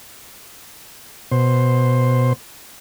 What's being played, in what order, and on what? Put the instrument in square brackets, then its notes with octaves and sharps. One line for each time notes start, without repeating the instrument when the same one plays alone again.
[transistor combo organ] B2 C5